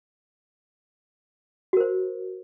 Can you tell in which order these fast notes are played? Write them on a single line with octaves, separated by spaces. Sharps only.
F#4 A#4 C5